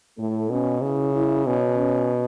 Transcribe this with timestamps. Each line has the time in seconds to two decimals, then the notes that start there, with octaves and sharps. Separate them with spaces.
0.18 A2 A3
0.50 B2 C#4
0.81 C#3 E4
1.14 E4
1.45 B2 C#4
1.78 C#4